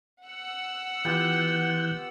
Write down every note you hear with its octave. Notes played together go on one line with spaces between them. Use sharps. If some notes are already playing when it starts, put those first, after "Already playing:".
F#5 E6
E3 B3 F4 G4 F#6 G6